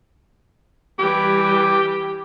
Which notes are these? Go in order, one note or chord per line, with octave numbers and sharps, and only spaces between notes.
E3 G3 G4